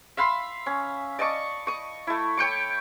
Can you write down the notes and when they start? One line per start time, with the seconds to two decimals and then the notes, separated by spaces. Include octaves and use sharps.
0.17 E5 F5 B5 C6
0.66 C#4
1.19 D5 D#5 A5 C#6
1.67 C#6 D#6
2.07 A3 E4
2.37 C#5 G5 C#6 D6